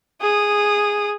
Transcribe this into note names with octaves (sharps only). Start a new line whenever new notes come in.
G#4 D#6